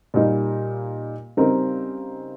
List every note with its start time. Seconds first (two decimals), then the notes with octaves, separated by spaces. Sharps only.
0.14 A#2 G3 A#3 D#4
1.37 C#3 G3 C4 D#4 A#4